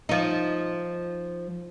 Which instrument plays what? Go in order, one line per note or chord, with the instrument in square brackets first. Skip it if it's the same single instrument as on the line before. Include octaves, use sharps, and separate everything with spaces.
[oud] F3 D#4